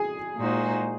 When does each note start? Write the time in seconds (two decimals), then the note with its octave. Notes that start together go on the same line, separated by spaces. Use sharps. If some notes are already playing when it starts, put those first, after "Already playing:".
Already playing: G#4 G#5
0.37 A#2 G#3 D#4 F#4 C5